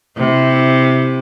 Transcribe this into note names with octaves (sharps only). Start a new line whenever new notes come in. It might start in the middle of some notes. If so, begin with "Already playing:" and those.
C3 E4